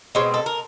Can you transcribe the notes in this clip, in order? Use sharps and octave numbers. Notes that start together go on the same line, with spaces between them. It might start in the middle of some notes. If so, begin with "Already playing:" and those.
B2 G#3 C4 C#5
A4
A#4